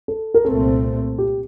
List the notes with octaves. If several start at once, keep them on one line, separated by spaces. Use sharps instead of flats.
A4
A#4
C2 A#2 A3 C4 A4
G4